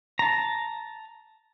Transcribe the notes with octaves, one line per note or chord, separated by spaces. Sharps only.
A5 A#5